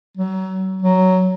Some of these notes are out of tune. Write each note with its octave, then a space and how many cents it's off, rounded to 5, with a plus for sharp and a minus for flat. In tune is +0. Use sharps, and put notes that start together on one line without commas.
F#3 +30
F#3 +10